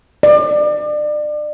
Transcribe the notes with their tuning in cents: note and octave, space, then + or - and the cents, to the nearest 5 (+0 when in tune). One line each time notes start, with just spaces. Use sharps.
D5 +30